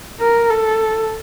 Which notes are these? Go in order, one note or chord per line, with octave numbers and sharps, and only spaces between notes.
A#4
A4